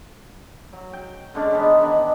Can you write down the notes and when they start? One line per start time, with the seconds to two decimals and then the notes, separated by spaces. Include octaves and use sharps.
0.73 F#3
0.93 G5
1.34 D3 G#3 C#4 D4
1.52 E3 G#3 B3 D#4
1.81 D#3 D4